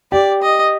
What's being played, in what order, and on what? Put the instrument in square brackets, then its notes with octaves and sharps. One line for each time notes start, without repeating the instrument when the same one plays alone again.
[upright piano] G4 [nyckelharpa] D5
[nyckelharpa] D#5